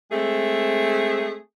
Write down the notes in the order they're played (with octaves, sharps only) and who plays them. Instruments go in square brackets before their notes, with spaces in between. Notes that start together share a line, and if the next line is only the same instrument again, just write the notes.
[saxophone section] G#3 A3 C4 G#4